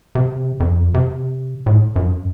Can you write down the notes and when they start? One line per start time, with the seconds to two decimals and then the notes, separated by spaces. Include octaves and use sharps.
0.15 C3
0.60 F2
0.94 C3
1.66 A2
1.96 F#2